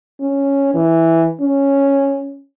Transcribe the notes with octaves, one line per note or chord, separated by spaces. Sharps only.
C#4
E3
C#4